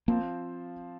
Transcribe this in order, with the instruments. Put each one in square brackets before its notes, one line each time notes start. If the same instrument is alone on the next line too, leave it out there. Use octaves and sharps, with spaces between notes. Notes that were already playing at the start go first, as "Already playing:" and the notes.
[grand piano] F3 C4 F4 [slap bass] A#3